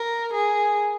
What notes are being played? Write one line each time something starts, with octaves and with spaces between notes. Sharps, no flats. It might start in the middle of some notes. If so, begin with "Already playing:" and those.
Already playing: A#4
G#4